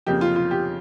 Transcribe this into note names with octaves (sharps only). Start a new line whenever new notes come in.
F2 C#3 F3 A#3 G4
F4
F4
G4